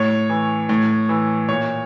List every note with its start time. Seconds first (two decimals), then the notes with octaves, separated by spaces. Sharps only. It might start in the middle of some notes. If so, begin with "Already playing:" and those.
Already playing: A2 C#5
0.30 E3
0.69 A2
1.09 E3
1.48 A#2 C#5